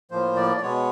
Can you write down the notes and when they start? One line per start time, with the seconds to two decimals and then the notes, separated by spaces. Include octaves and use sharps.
0.11 A2 F3 A#3 C5
0.36 D5
0.57 D5
0.62 B2 G#3 B3 C#5